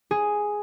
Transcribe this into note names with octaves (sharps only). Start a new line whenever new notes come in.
G#4